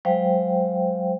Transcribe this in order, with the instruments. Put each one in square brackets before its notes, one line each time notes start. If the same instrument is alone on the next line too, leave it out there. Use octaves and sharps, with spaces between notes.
[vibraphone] F#3 G#3 C5 F5 G5